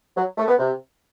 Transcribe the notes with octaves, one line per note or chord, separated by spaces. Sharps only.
F#3
A3
B3
C3